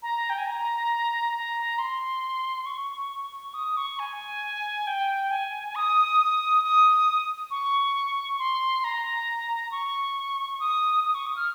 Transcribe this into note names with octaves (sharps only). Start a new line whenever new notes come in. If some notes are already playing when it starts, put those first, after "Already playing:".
A#5
G5
G#5
A#5
A#5
C6
C#6
D#6
C#6
G#5
G5
G#5
D#6
D#6
C#6
C6
A#5
C#6
D#6
D#6
C#6
D#6
F6